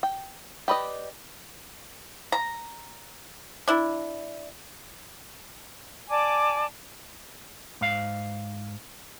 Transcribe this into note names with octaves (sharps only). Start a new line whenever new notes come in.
G5
G4 B4 D5 D#5
A#5
D4 E4
D5 G#5 A5 D6
G#2 F5